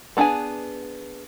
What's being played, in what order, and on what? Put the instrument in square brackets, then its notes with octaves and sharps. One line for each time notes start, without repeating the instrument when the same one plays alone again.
[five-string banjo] B3 D4 G#4 G5 G#5